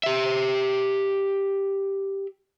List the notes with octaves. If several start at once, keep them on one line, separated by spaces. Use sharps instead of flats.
G4 E5